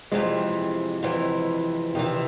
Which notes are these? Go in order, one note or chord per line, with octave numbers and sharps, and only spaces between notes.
F2 C3 E3 G#3
F2 C3 E3
F2 C3 D#3 E3